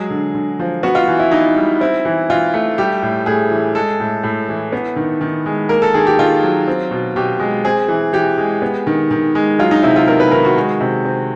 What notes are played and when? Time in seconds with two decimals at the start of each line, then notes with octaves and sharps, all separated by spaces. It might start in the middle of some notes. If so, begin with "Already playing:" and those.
Already playing: F#3 G#3 G#4
0.10 D3
0.34 D3
0.59 F3
0.83 B3 F#4
0.95 F4
1.08 E3
1.19 E4
1.31 E3 D#4
1.56 G3
1.81 C4 E4
2.05 E3
2.30 E3 F4
2.54 A3
2.78 G3 G4
3.02 A2
3.26 A2 G#4
3.51 E3
3.75 G#3 A4
4.00 A2
4.23 A2
4.49 E3
4.72 B3
4.96 D#3
5.21 D#3
5.46 G#3
5.69 A#3 A#4
5.82 A4
5.94 D#3 G#4
6.07 G4
6.19 D#3 F4
6.43 F#3
6.67 C4
6.91 B2
7.16 B2 G4
7.39 G#3
7.65 C4 G#4
7.88 E3
8.13 E3 G4
8.38 G#3
8.62 B3
8.87 D#3
9.11 D#3
9.35 G#3
9.59 F#3 F4
9.71 D#4
9.83 C3 E4
9.96 F4
10.07 B3 A#4
10.20 B4
10.31 D#3 A#4
10.45 F#4
10.57 G#3
10.81 C3
11.05 C4